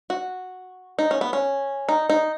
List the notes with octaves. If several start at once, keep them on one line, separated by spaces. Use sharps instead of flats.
F#4
D#4
C#4
B3
C#4
D#4
D#4